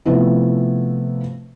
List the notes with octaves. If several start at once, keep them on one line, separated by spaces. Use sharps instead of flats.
C3 F3 A3 B3 E4